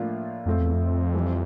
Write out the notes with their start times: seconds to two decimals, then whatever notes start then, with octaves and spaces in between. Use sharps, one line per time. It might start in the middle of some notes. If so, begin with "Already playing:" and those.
Already playing: A2 F3 A#3 D4 F4
0.46 F2 A2 F3 A3 C4 F4
0.59 E2
0.74 F2
1.14 E3 G3 C4